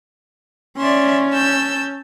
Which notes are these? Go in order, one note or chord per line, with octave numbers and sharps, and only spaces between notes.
C#4 D5 E5 C6
A5 E6 G6